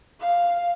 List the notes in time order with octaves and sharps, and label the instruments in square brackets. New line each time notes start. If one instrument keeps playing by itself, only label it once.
[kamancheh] F5